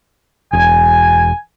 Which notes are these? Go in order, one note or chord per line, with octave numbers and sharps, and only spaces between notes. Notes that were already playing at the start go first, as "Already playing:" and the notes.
E1 G#5